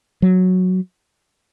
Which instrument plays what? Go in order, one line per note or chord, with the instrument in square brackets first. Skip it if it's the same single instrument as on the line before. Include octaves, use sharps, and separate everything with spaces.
[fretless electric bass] F#3